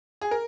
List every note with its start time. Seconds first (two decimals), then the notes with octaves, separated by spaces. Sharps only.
0.21 G#4
0.31 A#4